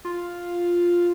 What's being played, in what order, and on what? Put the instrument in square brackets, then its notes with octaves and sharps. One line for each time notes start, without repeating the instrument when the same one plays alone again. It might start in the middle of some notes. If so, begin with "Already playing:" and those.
[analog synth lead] F4